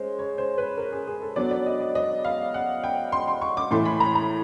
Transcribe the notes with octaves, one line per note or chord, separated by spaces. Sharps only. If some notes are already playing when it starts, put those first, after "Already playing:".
Already playing: G#3 C#4 C5
C#5
C5
B4
A#4
G#4
G#4
A4
F#3 B3 D4 D5
D5
D#5
D#5
D#5
F5
F#5
G5
C6
C6
C#6
D6
A2 E3 A3 C6
B5
A#5
A#5